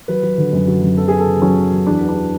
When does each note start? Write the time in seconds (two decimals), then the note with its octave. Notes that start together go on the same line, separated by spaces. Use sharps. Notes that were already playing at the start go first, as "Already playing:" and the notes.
0.08 F#3 B4
0.23 F#3
0.38 D3
0.53 F#2
0.67 F#3
0.82 F#2
0.97 B3 A4
1.08 B3 G#4
1.19 A4
1.27 C#3
1.42 F#3 C#4
1.57 B3
1.72 F#3
1.86 E2 D4
2.01 B3
2.09 D4